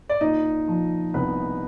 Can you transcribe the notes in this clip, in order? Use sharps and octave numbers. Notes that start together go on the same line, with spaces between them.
D5
A#2 D#4 D#5
F3
C2 B3 B4